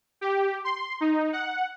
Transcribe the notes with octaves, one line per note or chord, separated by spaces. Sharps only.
G4
C6
D#4
F#5